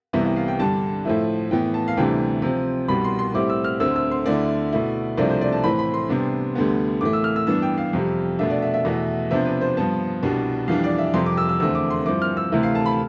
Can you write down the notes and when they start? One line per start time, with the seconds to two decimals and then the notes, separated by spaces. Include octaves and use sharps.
0.13 C2 C3 E3 G3 B3 E5
0.25 E5
0.36 F5
0.48 G5
0.59 G2 D3 G3 D4 A5
1.05 A2 F3 A3 E4
1.51 A2 E3 B3 G5
1.74 A5
1.88 F5
1.97 D2 C3 E3 G3 D4 G5
2.42 C3 F3 C4
2.88 C2 B2 G3 B5
3.04 C6
3.19 C6
3.34 A2 G3 C4 E4 D6
3.50 E6
3.64 F6
3.80 D2 D3 A3 C4 E6
3.96 E6
4.11 C6
4.26 D2 D3 A3 E4 D5
4.73 B2 A3 E4
5.17 C2 C3 F3 A3 D4 D5
5.29 C5
5.41 D5
5.52 A5
5.64 A2 E3 A3 C4 B5
5.79 B5
5.94 C6
6.09 C3 G3 B3 D4
6.55 D2 D3 G3 B3
7.01 A2 E3 A3 D6
7.13 E6
7.24 F6
7.36 E6
7.47 G2 E3 B3 D4 E6
7.62 G5
7.78 F5
7.93 F2 C3 G3
8.39 B2 A3 D4 E5
8.50 D5
8.62 E5
8.74 E5
8.85 E2 B2 A3 E4
9.31 C3 F3 B3 D4 E5
9.45 B4
9.61 C5
9.77 G2 F3 B3 A5
10.23 C2 B2 G3 D4
10.68 F2 E3 G3 D4 F5
10.84 D5
10.98 E5
11.14 F2 C3 G3 C6
11.26 D6
11.38 E6
11.49 E6
11.60 E2 D3 A3 C4 E6
11.75 D6
11.90 C6
12.06 G2 F3 C4 E4 D6
12.22 F6
12.37 E6
12.52 D2 C3 E3 A3 E4
12.63 F5
12.75 A5
12.86 B5